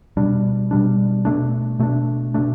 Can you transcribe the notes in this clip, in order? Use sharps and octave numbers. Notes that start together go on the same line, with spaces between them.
B2 G3 D4
B2 G3 D4
B2 A3 D4
B2 A3 D4
B2 A3 D4